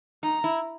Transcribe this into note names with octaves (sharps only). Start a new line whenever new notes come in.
D#4 A#5
E4